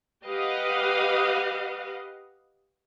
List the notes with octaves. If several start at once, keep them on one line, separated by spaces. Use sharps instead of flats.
G4 B4 D#5 F5 F#5